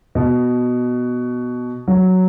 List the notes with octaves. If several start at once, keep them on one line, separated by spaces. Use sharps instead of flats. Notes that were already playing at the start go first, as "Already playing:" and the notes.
B2
F#3